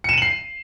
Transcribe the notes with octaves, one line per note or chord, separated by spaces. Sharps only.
C7 C#7 D#7 E7 F#7